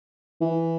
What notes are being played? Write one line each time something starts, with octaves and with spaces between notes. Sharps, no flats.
E3